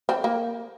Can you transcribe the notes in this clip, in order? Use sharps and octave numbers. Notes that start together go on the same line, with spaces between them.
C4
A#3